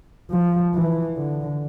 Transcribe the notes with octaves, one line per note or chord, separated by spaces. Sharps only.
F3
E3
D3